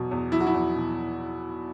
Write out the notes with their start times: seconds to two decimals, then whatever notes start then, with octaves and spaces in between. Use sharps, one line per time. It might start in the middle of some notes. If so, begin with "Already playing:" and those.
Already playing: E2 B2 F#3
0.11 E2
0.32 F#3 E4
0.40 F#4
0.47 E4
0.54 E2
0.76 B2